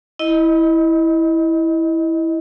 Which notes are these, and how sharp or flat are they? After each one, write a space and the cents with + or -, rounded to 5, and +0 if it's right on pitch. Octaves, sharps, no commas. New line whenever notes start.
E4 -10 D#5 +0